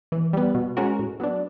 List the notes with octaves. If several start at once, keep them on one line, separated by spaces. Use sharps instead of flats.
E3
G3 B3
B2
G#3 C#4 F#4 A#4
A2
F#3 B3 D4